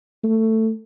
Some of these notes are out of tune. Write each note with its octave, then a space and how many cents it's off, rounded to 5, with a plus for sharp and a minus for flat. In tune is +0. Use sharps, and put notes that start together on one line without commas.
A3 +15